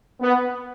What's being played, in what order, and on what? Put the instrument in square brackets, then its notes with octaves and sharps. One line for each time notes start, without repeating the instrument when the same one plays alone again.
[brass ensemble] B3